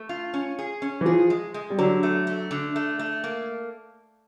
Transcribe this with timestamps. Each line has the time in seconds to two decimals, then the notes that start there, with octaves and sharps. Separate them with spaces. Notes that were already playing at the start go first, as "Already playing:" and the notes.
Already playing: A3
0.09 F4
0.34 C#4
0.59 G#4
0.82 C#4
1.01 E3
1.06 F3 G#4
1.30 G#3
1.54 G#3
1.70 G3
1.78 D3 F#3
2.03 A3
2.27 A3
2.51 D3
2.76 A3
2.99 A3
3.24 A#3